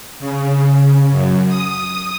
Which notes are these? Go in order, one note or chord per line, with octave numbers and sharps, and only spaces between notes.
C#3
F#2
D#6